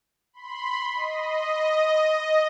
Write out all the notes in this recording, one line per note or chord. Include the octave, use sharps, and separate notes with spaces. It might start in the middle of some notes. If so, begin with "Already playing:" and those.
B5 C6
D#5